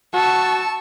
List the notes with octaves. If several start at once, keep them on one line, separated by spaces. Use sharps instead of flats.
F#4 A5 C#6 E6